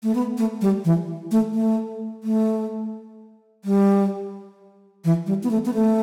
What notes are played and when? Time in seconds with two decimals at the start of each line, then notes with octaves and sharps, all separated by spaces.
0.03 A3
0.15 B3
0.38 A3
0.61 G3
0.85 E3
1.31 A3
1.55 A3
2.24 A3
3.65 G3
5.04 E3
5.27 G3
5.43 B3
5.51 A3
5.66 B3
5.74 A3